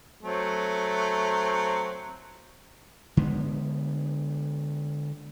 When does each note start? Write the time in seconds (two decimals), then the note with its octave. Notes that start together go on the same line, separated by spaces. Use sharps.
0.23 F#3 A3 C4
3.17 D3 G#3 B3